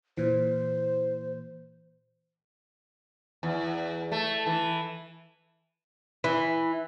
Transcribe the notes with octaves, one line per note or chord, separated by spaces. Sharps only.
A#2 E3 C5
E2
A3
E3
E3